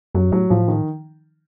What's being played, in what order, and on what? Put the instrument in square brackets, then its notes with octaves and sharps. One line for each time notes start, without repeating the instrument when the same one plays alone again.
[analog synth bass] F#2 [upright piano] F#3
[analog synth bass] A2 [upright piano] F#3
[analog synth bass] A2 [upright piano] F3
[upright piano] D#3